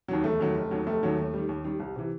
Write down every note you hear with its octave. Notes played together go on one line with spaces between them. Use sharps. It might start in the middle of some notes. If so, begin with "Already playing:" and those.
D#2 D#3 F#3
E1 A3
D#2 D#3 F#3
F1
D#2 D#3 F#3
F1 A3
D#2 D#3 F#3
D#2
D#3 G3
D#2
D#3 G3
C2
C3 E3